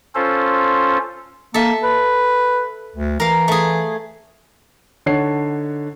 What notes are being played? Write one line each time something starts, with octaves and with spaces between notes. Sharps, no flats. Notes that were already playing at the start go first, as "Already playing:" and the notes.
C#4 F4 A4 C5
A#3 A4 E5
B4
D2
E3 A#4 F5
A3 G#4
D3 D#4 C#5 F#5 A5 C7